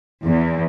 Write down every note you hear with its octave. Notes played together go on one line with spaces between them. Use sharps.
E2